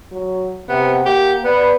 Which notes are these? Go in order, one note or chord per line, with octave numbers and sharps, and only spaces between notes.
F#3
C3 B3 F#5
A#3 G4
B3 B4 D5